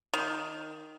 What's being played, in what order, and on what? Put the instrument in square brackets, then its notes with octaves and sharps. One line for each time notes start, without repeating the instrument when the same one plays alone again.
[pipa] D#3